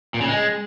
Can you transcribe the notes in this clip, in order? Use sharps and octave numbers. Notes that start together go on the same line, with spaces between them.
A#2
C#3
G#3